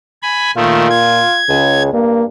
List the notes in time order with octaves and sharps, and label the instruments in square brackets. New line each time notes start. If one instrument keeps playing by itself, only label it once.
[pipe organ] G#5 B5
[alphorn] A#2 [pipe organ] D#3 A3 [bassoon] F4
[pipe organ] G#6
[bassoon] C#2 [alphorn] C#3
[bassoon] G2 [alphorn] A#3